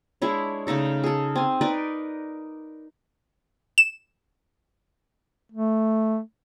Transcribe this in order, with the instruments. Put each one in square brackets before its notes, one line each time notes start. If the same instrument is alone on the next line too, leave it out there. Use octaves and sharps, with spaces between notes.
[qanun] G#3 D4 E4 C#5
C#3 A3 D#4 A4
G#4 A4
C4 G#5
D#4 A#4 B4 D5
[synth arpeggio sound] E7
[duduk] A3